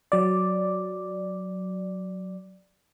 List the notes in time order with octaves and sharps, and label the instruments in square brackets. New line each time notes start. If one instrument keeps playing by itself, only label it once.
[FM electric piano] F#3 D5